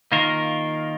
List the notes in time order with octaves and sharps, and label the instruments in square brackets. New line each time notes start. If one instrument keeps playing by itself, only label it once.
[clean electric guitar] D#3 A#3 F4 A#4